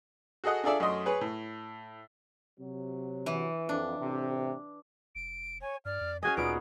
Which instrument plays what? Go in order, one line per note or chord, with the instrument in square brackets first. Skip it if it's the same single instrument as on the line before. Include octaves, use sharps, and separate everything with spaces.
[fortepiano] F#4 G#4 A4 D#5 F#5
D4 F4 G#4 A4 D5 E5
F#2 A3 D#5 C6
G#4 B4 C#5
A2
[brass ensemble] C3 F#3
[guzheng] E3
[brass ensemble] F2 [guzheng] D4
[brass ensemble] A1 C3
[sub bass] F1 [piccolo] D7
[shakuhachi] C#5 [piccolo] G#5
[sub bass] G2 [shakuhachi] D5 [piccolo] F6
[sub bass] F2
[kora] C#4 F#4 D#5 [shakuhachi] G#4 [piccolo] G#5
[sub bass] D2 [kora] A#2 B3 D#4 [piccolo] D7